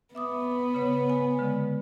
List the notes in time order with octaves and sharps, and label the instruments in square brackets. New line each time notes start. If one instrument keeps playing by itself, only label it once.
[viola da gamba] B3 [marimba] E5 D6 D#6
[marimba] C#3 C#5
G#5
D3 G#3